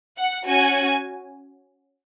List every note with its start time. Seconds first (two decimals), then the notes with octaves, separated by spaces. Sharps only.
0.18 F#5
0.46 C#4 F#4 G#5